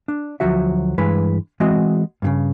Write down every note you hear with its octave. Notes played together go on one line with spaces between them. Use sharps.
D4
D2 F3 F#3 F#4 E5
G2 E3 G#3 B4
E3 G#3 C4 F#4 D#5
G2 A#2 C#3